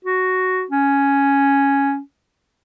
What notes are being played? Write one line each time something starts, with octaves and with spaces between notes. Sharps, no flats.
F#4
C#4